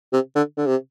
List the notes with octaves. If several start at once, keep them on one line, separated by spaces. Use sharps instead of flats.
C3
D3
D3
C3